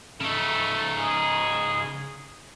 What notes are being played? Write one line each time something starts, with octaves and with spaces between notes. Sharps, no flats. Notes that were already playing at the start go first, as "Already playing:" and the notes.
C#3 A3 D#4
G#4